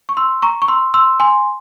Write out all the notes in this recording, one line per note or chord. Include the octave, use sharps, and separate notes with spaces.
C#6
C6 E6
A#5 C#6
C#6
C6 E6
C6 E6
G#5 C6